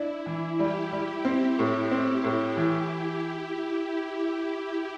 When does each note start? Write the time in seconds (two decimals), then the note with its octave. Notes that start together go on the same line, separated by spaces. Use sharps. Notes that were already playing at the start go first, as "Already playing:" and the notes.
Already playing: D4 E4
0.26 E3
0.59 G3 G4
0.92 G3
1.25 C4
1.59 A2
1.91 C4
2.24 A2
2.57 E3